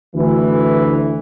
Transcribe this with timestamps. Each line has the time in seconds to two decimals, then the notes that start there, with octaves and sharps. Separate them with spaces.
0.16 D2 E3